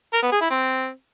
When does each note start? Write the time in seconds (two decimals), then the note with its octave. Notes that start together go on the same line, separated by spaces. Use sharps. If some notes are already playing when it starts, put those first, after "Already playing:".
0.13 A#4
0.22 B3
0.32 G#4
0.41 E4
0.50 C4